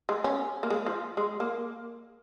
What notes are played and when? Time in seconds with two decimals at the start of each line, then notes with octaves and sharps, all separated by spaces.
0.09 G#3
0.24 C#4
0.63 A#3
0.70 G#3
0.86 F3
1.17 G#3
1.40 A#3